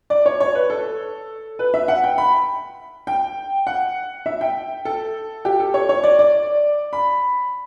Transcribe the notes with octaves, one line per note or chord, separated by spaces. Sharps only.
D5
C#5
C#5
B4
A4
B4
E5
F#5
G5
B5
G5
F#5
E5
G5
A4
G4
A4
C#5
C#5
D5
D5
B5